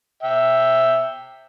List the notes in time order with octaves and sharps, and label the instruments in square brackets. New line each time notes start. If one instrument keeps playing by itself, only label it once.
[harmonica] E5 G5